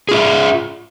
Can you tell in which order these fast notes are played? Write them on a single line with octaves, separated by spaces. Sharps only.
G#4 F4 E5